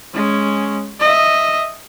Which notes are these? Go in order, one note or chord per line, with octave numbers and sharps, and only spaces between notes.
G#3 C#4
D#5 E5